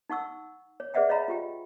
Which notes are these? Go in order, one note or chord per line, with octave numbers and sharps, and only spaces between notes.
D#4 F#5 C#6 E6
C#5
G#4 B4 D5 E5 F#5 G5
C#5 D#5 F5 A#5 B5
F4 G4 G5